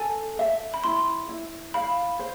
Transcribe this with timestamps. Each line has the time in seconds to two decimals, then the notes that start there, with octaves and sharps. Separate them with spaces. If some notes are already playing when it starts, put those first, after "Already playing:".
Already playing: A4 G#5
0.39 E5
0.74 B5
0.84 E4 C6
1.29 E4
1.74 F5 B5
2.19 C5